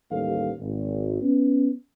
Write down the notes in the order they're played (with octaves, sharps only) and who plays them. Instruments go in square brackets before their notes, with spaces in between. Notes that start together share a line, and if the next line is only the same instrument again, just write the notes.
[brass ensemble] A1 D#2 G3 A4 F5
G#1
B3 C#4